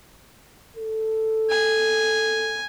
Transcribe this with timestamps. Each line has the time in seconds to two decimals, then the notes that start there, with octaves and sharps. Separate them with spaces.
0.76 A4
1.50 G#5